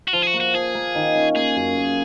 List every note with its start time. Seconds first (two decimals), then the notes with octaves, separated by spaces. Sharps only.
0.08 F#4
0.13 F3 F4
0.22 G#4
0.27 F#4
0.34 A#3
0.40 F#4
0.54 F3 G#4
0.75 A#3
0.95 D#3
1.15 C#4
1.36 A#3 G#4
1.56 F#2
1.76 A#3